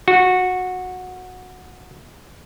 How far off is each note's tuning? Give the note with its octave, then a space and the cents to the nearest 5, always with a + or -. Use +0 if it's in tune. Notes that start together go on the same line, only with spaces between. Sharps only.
F#4 -15